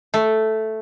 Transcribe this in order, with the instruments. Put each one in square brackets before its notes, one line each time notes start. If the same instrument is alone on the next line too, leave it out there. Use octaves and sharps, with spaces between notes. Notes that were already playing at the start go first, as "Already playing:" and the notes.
[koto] A3